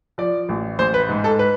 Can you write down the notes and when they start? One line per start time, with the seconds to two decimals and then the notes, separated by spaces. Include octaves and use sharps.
0.18 F3 D5
0.49 A1
0.79 A1 C5
0.94 B4
1.09 G#2
1.24 A4
1.39 B4